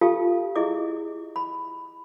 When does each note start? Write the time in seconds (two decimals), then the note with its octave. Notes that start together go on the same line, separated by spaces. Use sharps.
0.01 F4 G4 A4 F5 A5
0.56 E4 G#4 D#5 E5 D6
1.36 B5